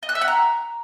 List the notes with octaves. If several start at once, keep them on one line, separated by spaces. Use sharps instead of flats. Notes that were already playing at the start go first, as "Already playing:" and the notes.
D#5
F#6
E5
F#5
A#5